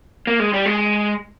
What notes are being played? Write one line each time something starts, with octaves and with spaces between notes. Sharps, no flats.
A#3
G#3
G3
G#3